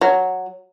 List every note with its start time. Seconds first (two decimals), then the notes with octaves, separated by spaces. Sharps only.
0.01 F#3